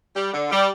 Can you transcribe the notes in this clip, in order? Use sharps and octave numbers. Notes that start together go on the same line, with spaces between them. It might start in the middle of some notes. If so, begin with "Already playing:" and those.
G3
D3
G3